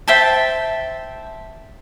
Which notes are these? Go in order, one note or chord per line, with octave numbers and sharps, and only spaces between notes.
C5 E5 G5 A5